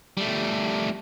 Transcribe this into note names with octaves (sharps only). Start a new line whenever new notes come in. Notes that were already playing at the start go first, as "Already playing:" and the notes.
G3 A3